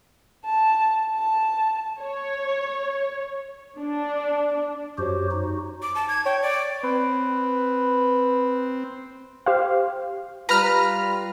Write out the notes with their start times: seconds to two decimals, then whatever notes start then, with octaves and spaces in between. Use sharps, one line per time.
0.44 A5
1.15 A5
2.02 C#5
3.79 D4
4.98 F#2 F#4 G4 C5 C#5
5.31 D#4 F#4
5.82 D6
5.95 A5
6.08 G#6
6.26 C#5 G5
6.42 D5
6.83 C4 B4
9.46 G4 C5 F5
10.49 G3 F4 B4 A#5 F6